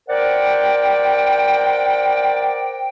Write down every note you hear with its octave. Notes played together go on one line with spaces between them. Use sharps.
A#4 C5 D5 F#5 G5